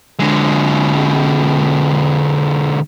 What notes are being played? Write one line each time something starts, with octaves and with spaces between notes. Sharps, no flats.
D3 G#3